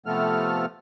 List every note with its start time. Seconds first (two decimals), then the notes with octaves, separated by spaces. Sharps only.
0.06 C3 F3 A3 B3 A4 F6